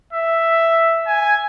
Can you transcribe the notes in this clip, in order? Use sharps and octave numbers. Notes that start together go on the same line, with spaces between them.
E5
G#5